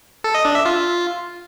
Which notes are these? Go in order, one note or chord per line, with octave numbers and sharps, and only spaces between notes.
A4
D#5
D4
E5
F4